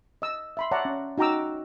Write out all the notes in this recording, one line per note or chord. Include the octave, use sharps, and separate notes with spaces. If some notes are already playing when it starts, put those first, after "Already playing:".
D#5 E6
E5 B5 C6
C#5 D5 E5 F#5 A5 A#5
C#4
D#4 F#4 G5 A#5 D6 E6